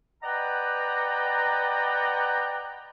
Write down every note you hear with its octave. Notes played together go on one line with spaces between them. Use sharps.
B4 D5 D#5 F#5 G5 A#5